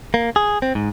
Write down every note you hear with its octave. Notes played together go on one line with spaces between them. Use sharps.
A#3
G#4
C4
G#2